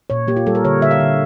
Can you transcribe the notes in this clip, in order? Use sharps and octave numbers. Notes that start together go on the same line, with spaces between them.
A#2 C#5
A#3 G4
F4
G3 A4
A#4
D3 C#5
D3 E5
F5
D3